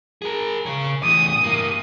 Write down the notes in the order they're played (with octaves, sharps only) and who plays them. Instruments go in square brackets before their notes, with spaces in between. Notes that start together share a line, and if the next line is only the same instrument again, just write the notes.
[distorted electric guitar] G#4 A#4
C#3 C#5
[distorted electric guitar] E2 A2 [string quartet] D#6
[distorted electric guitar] G2 A#3